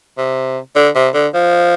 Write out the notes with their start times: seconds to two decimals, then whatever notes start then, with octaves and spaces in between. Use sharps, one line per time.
0.18 C3
0.76 D3
0.96 C3
1.14 D3
1.34 F3